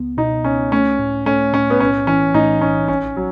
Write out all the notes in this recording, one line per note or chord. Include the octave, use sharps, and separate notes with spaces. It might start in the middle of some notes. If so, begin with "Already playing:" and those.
Already playing: C#2 B3
B2 D#4
C#2 C#4
A3 C#4
A2
A3 C#4
A2 C#4
B3
B1 C#4
E3 C#4
A2 D#4
B1 C#4
A1 C#4
F#3